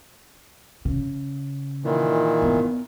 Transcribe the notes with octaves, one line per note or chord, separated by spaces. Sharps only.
C#3
A#2 D#3 E3
B3